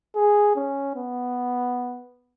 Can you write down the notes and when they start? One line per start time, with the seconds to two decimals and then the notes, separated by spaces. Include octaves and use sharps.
0.16 G#4
0.56 C#4
0.96 B3